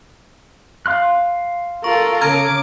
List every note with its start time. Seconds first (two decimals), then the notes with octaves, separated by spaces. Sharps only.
0.86 F5 C6 F#6
1.84 F4 A4 A#4 C#6
2.21 C#3 A#5 D6 F6 G#6